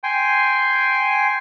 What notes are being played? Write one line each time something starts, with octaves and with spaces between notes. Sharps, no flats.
G5 G#5 C6